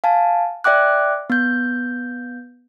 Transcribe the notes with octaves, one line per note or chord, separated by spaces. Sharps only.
F5 G#5 A5
D5 E5 G5 D6 F#6
B3 G6